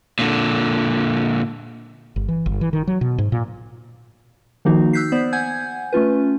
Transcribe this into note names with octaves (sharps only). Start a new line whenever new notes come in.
A#2 D3
G1
E3
G1
E3
D#3
F#3
B2
G#2
A#2
D#3 F3 A#3 D#4 F#4
E6 F#6 G6 B6 C7
B3 C5 D5
F#5 G#5 G6 G#6
A3 C#4 F4 B4